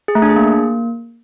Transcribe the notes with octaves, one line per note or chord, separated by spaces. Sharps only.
G#4
A3
D4
G#4
A#3